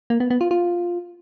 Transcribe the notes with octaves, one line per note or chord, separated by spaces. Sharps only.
A#3
B3
B3
F4
F4